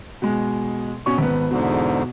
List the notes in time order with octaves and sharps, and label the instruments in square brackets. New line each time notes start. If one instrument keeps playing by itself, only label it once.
[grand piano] B2 G#3
B2 C#4 C#6
G#1 B3
[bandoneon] E2 G#2 D3 [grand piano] B2